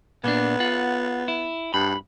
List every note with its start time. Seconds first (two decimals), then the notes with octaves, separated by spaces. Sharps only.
0.24 A#2 A#3 B3 D4
0.60 F4 F#5
1.28 E4
1.74 G2 B5